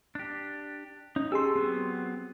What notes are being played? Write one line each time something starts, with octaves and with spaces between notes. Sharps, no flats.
D4 G4
C#4 D#4
C#4 G4 G#4 A5 C6 E6
F#3 B3 C4